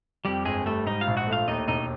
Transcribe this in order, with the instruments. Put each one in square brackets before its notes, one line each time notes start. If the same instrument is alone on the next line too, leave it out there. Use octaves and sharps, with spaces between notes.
[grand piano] F2 [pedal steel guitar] G3 G4
[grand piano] G1 [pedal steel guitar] G#3 G#4
[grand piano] G3 [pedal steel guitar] A3 A4
[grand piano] G#2 [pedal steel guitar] D#4 D#5
[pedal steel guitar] F4 F5
[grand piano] A#1
[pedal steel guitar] F#4 F#5
[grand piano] A3
[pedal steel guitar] F4 F5
[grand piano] D#2 [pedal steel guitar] D#4 D#5
[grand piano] E1 [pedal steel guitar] D#4 D#5